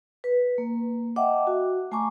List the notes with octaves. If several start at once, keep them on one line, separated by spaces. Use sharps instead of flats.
B4
A#3
D#5 E5 F#5 G5 A5 D6
F#4
A3 G#5 A#5 C#6 D6